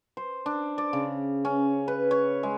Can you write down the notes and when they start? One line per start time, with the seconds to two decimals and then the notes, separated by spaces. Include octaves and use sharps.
0.17 C5
0.46 D4
0.78 D5
0.93 C#3
1.45 C#4
1.88 B4
2.11 C#5
2.43 G#3